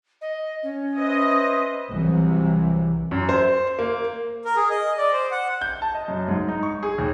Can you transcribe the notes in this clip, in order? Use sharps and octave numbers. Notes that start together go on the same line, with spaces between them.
D#5
C#4
B4 C5 D#5 E5
C2 C3 E3 F#3
F#2
C5
A#3
A#4
G#4
D#5
D5
C5
F#5
G6
A5
D#5
F#2
G#2
D#4
C#6
G#4
D#2